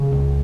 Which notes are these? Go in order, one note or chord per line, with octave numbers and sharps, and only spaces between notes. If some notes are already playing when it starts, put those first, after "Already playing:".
Already playing: C#3 C#4
C#2